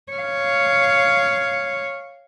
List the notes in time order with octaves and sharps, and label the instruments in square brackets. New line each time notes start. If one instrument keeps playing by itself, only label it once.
[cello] C#5 F5